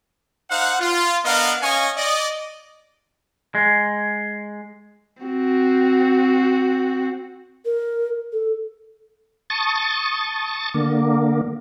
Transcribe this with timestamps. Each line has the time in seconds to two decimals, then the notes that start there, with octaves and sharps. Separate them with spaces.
0.50 D#4 C5 F5 F#5
0.80 F4
1.25 B3 D4 A#4 D#5 F5 F#5
1.62 C#4 D#5 F5 G#5 C#6
1.96 D5 D#5
3.55 G#3
5.23 C4 F#4
7.65 A#4
8.32 A4
9.50 A5 C#6 D#6 A6
10.74 D3 A#3